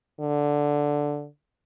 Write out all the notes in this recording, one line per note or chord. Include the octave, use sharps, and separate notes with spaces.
D3